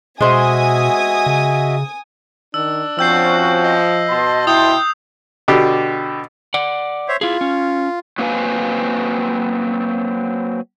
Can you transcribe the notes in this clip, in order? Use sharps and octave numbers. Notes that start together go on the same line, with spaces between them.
B2 G#3 F#4 C5 D#5 E5 G#5 D#6
C#3
D#3 D4 E6
F3 C4 C#4 F#4 E6 G6 C7
D#5
B2 A5 C6
E4 G5 D#6 G6
B2 D3 G4
D5 F#5
C5 C#5 E5
E4 F4 G#4
C#4
F#3 A#3 C4 B4 F5 G#5